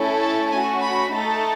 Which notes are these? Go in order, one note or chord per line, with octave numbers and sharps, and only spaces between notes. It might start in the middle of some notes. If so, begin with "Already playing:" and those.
Already playing: A3 C#4 E4 A4
A5
A3 C#4 F#4 G#5
B5
A3 D#4 A4